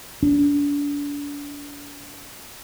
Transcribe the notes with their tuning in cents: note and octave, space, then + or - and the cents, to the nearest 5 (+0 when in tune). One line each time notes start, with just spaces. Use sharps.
D4 -35